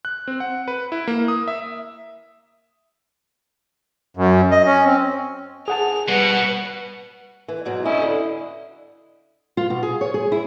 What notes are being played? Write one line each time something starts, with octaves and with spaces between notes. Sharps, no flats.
F#6
C4
F#5
B4
E4
A#3
D#6
E5
F#2
D#5
C#4
C4
G#4 F#5 A5 F7
B2 G3 B4 F#5
E3
G#2 B2 F#3
C#4 E4 D#5
D3
F4
B2
G#4
C#5
G#4
E4